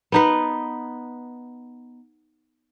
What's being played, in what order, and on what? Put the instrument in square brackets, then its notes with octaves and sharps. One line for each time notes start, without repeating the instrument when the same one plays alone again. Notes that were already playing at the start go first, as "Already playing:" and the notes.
[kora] B3 D#4 B4